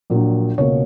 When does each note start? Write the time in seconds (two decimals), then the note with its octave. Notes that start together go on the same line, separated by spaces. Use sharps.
0.10 A#1 A#2 F#3
0.58 C#2 B2 A#3 C#5